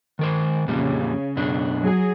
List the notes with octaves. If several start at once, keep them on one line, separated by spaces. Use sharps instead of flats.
D#3 A#4 C5
F2 A#2 C#3 G3
F#2 B2 D4
F#3 G#4